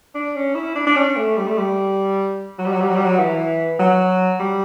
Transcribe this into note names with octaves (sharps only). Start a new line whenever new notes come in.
D4
C#4
E4
D4
D4
C#4
A3
G3
A3
G3
F#3
G3
F#3
G3
F#3
G3
F#3
E3
F#3
G3